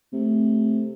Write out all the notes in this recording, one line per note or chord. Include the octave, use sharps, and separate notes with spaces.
C3 A3